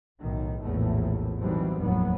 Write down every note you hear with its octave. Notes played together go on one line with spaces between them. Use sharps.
B1 A2 D#3
A#1 E2 A2 A3
B2 D#3 E3 F#3 G3 C4
F1 D#2 A2 F#3 B3